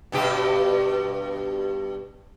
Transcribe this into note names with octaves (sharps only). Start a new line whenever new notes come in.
G2 B2 G4